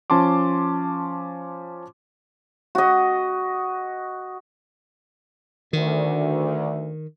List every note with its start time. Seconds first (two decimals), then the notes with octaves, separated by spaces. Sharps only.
0.10 F3 C#4 A5 C6 D6
2.75 F#4 D#5
5.73 D2 D#3